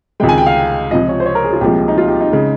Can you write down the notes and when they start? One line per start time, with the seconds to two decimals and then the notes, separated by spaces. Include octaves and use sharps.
0.20 C#2 C3 D#3 G#3 G5
0.29 G#5
0.38 G5
0.46 F5
0.91 C#2 C3 F3 D#5
1.09 C#5
1.20 C5
1.26 C#5
1.35 A#4
1.44 G#4
1.53 F4
1.61 C2 A#2 F3 G#3 G4
1.88 D#4
1.98 F4
2.08 G4
2.20 D#4
2.33 C#3 G#3